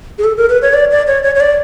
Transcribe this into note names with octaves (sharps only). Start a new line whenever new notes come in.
G#4
A4
A#4
B4
C#5
D5
D5
C#5
C#5
C#5
D5